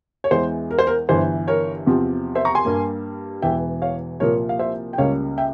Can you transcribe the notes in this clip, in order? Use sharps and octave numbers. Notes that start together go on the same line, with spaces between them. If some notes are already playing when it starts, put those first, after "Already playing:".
C#5
E2 E3 G#3 C5
A#4
C5
A#4
G1 G2 E3 C5
A#4 C#5
E2 C3 F3 C4
C5 E5
A#5 C#6
G#5 C6
G2 G3 A#3
E1 E2 E3 E5 G5
C#5 F5
C2 A#2 F3 A#3 A#4 C#5
F5
C5 E5
G5
C#2 C#3 G3 A#3 C#5 F5
E5 G5